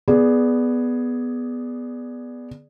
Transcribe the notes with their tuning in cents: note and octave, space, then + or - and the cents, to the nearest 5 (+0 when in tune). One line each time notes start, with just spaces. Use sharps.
B3 +0 G#4 +5 D5 +0